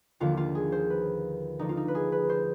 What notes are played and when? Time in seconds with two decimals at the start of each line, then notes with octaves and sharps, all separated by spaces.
0.20 D#2 D3 F3 F4
0.37 F4
0.55 G#4
0.72 C5
0.90 B4
1.59 D2 D3 F3 D#4
1.69 F4
1.77 D#4
1.88 B4
1.95 G#4
2.12 B4
2.29 C5